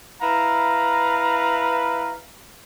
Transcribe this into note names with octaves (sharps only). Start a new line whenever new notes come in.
E4 B4 F5 A#5